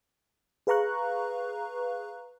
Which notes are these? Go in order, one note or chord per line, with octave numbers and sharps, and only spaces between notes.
G#4 B4 F5 A#5 C#6 F#6